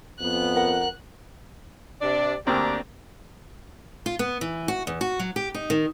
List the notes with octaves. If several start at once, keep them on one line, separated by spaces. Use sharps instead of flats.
F2 B3 F#6
A#4 F#5
C3 D4 D5
D2 A#3 C4 D4 G4 A#5
F4
B3
E3
F#4
E2
F#4
F#3
G4
D#4
D#3